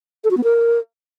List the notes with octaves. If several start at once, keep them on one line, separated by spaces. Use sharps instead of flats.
A4
F#4
B3
A#4